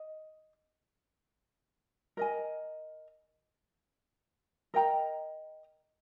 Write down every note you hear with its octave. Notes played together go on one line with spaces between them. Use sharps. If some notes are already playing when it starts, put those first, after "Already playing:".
Already playing: D#5
A#4 D#5 G#5
A#4 D#5 G5 A#5